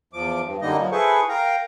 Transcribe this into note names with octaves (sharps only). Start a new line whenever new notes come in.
E2 F3 D6
G2
F#2 D3 G3 A#3 D#4 D#5
F3 F#3
E4 G#4 A4 B4 C5 C#6
A#4 F5 G5 A#5